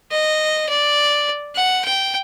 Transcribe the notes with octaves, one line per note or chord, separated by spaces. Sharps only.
D#5
D5
F#5
G5